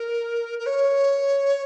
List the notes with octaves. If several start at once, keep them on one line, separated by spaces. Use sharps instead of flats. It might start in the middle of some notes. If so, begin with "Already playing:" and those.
Already playing: A#4
A#4
C#5